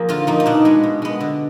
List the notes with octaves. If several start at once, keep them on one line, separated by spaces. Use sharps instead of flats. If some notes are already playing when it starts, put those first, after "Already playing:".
Already playing: F3 A#3 G#4
D3 F4
F3 A#3 D#4
D#4
B2 D4
G#3 B3
B2
G#3 B3
D3